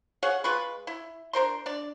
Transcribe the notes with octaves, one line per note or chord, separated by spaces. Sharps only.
G#4 C#5 F5 F#5
G#3 F4 B4 C#6
E4
D4 A#4 C5 C6
D4 D5